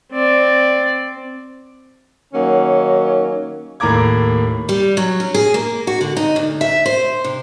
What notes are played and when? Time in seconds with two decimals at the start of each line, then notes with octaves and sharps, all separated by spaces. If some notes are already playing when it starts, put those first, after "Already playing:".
0.12 C4 D5
2.33 D#3 F#3 A#3 C#4
3.80 D#2 A2 A#3 A#5 D6 G#6
4.69 G3
4.97 F#3
5.20 C#4
5.34 G#4
5.54 A#3
5.87 F#4
6.01 D3
6.17 D#4
6.36 D2
6.61 E5
6.86 C5
7.24 C3